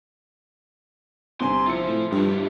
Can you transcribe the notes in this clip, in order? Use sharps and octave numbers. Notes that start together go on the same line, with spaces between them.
G1 C3 C4 G#5 C6
E4 F4 C5 C#7
A2
G2 G3 F4
B2 G4